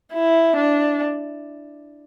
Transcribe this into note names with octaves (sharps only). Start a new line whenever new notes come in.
E4
D4